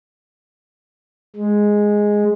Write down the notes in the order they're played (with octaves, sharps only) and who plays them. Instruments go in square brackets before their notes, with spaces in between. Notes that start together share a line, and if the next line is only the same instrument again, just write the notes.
[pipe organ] G#3